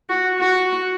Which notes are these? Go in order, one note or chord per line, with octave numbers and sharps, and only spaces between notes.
F#4
F#4